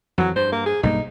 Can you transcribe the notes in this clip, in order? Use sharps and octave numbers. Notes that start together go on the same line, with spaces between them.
F2 E3 F#3
G2 C5
A#3
G#4
B1 G2 A#3 D#4